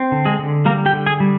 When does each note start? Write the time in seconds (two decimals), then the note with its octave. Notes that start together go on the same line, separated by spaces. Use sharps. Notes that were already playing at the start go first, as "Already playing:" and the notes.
Already playing: C4
0.12 D3
0.25 G#3 G#4
0.39 D3
0.65 G3 A#3 A#4
0.86 G4 G5
0.93 D3
1.06 G#4 G#5
1.20 G3